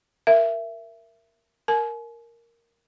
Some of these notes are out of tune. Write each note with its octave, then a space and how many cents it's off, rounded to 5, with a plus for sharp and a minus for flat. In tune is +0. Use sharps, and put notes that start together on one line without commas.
A#4 +0 E5 +20
A#4 +0 G#5 +40